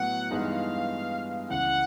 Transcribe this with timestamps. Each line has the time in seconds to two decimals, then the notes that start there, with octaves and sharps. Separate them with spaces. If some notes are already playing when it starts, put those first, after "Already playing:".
Already playing: A2 F#3 B3 F#5
0.31 G2 E3 G#3 B3 D#4 F5
1.49 C#2 C#3 E3 F#5